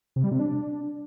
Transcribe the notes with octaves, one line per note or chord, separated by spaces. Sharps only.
C3
G3
C3
D4